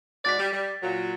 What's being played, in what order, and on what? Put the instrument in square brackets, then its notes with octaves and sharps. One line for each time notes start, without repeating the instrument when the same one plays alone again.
[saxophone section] G#2 F#4 D5 [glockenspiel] A6 B6
[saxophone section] G3
G3
A#2 F#3